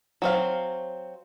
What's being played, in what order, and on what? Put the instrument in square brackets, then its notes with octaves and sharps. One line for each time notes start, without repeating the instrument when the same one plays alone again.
[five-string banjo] F#3 C4 F5